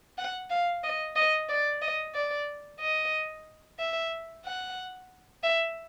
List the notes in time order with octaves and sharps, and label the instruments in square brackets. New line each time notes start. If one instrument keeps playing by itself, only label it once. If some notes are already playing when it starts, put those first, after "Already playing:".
[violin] F#5
F5
D#5
D#5
D5
D#5
D5
D#5
E5
F#5
E5